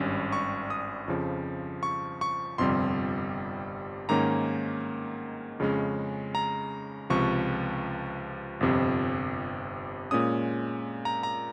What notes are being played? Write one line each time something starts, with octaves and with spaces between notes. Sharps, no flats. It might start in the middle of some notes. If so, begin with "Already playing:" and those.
Already playing: G#1 G2 G3 C#4
C#6
D#6
F2 C#3 F3
C#6
C#6
G1 F2 C3 G3 C6
G#2 D#3 A#3 C#4 A#5
F2 C#3 G#3 C#4
A#5
C#2 C3 F3 C#6
G1 F2 C3
A#2 G#3 C#4 D#6
A#5
A#5